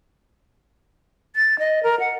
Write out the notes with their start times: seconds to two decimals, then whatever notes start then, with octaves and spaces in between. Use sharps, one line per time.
1.36 A6
1.59 D#5
1.83 A#4
2.00 F#5